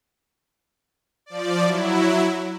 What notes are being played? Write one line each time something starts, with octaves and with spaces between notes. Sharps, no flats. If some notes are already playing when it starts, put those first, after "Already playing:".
F3 D5
F#3 E4